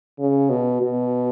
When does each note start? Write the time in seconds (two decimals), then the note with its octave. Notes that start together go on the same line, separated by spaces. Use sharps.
0.19 C#3
0.50 B2
0.81 B2